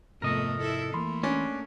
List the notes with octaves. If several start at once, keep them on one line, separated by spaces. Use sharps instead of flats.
F2 G#2 C3 A3 B3 A#4 D#5
E4 A4
E3 A3 A#3 B5 C6
C#4 D4